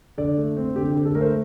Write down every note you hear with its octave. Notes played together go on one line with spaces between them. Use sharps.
D3 D5
A3
C4
D3 G4
G4
D3
A4
A3 A#4
C5